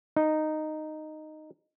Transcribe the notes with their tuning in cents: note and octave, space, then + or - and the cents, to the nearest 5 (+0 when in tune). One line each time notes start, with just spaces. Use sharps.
D#4 -10